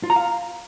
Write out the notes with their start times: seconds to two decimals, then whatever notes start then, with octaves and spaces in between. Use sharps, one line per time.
0.04 F4
0.10 A#5
0.16 F5